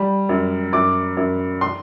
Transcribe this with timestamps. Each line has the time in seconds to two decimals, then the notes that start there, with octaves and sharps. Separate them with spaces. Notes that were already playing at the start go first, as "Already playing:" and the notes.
Already playing: G3
0.29 F#2
0.72 F#2 D6
1.17 F#2
1.61 C6